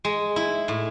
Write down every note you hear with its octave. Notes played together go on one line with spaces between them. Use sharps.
G#3
E4
A2